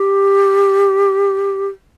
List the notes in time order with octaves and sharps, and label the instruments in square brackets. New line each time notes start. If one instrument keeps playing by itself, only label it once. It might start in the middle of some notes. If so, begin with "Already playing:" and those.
Already playing: [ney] G4